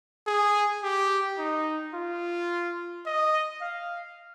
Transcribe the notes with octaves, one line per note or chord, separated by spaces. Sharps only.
G#4
G4
D#4
F4
D#5
F5